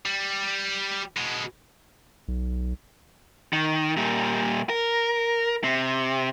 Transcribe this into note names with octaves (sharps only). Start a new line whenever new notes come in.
G3
B2 G#3
B1
D#3
A#2 G3
A#4
C3